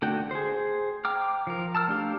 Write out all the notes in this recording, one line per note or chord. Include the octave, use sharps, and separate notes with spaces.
D3 A3 F#4 G5
G#4 C5
G5 A#5 D6 F6
F3 A#4
A5 E6 F6
A3 D4 G4 F5